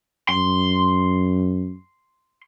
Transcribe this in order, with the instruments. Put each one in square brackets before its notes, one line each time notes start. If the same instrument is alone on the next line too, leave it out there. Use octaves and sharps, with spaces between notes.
[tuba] F#2 [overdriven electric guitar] C6